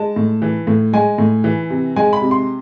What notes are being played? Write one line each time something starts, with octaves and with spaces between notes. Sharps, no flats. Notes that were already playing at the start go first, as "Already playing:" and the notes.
Already playing: G#3 A5
A2
E3
A2
G#3 G#5
A2
E3
C3
G#3 G#5
B5
C3
C6